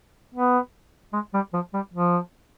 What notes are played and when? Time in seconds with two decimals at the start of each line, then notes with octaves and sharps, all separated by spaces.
0.35 B3
1.13 G#3
1.34 G3
1.53 F3
1.74 G3
1.94 F3